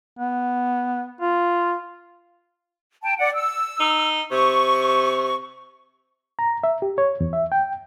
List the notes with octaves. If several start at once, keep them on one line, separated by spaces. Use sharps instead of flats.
B3
F4
G5 A5
D5 F#5
E6
D#4
C3 C#6
A#5
E5
G4
C#5
E2
E5
G5